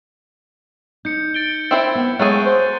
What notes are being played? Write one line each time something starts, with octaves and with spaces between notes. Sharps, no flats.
D#4 G6 C#7
A6 D7 G7
C4 E4 C5
B3
F#3 G#3 A3 G#4 F#6 A6 D#7
C5